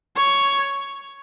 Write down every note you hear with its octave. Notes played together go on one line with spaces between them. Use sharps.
C#5